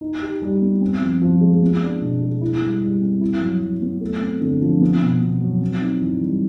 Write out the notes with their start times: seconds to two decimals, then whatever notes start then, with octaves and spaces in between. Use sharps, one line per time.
0.01 D#4
0.22 G4
0.42 G3
0.62 B3
0.81 C4
1.01 F3
1.22 F3
1.41 G#3
1.62 B3
1.82 D4
2.01 B2
2.21 G#3
2.41 E4
2.61 G3
2.81 G3
3.02 C4
3.21 E4
3.41 F#3
3.62 F#3
3.82 B3
4.01 A3
4.22 C4
4.42 D3
4.61 F3
4.81 B3
5.01 B2
5.21 B2
5.41 F#3
5.61 C4
5.81 D#4
6.01 E3
6.21 G3